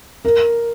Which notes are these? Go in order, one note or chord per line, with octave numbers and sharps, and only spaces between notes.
A#4